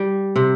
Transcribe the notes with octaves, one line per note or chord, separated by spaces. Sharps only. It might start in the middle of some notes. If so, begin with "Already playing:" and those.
Already playing: G3
C3